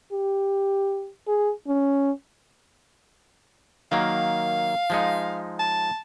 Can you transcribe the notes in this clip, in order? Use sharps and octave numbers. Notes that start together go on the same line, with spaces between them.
G4
G#4
C#4
D#3 F#3 A#3 F5
F3 G#3 D#4
A5